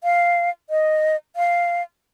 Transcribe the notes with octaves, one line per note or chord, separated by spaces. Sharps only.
F5
D#5
F5